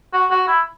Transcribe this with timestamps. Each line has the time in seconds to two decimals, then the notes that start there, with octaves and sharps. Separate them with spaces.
0.13 F#4
0.31 F#4
0.47 E4